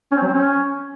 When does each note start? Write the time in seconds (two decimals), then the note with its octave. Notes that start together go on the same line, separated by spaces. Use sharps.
0.11 C#4
0.17 C4
0.22 F#3
0.27 C4
0.33 C#4